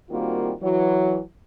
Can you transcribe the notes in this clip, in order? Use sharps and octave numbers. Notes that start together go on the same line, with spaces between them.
D#3 G3 A#3 C4 F4 F#4
E3 F#3